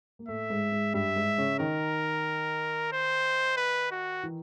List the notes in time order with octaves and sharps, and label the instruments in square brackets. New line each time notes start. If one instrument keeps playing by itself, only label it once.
[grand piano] A#3
[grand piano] A2 A3 [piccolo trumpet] E5
[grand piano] G#2 G#3
G#2 G#3
[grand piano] G2 G3 [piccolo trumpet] E5
[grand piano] G#2 G#3
C#3 C#4
[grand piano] D#3 D#4 [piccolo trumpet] A#4
[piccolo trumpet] C5
B4
F#4
[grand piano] E3 E4